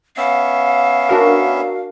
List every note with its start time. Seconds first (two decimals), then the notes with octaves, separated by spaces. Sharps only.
0.17 B3 C#4 E5 F5
1.09 D4 F#4 A#4